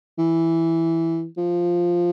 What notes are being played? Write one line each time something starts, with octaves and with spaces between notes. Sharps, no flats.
E3
F3